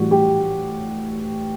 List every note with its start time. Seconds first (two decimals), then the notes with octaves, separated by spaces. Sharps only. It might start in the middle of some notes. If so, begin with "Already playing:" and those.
Already playing: A2 E3 G3 F#4
0.11 G4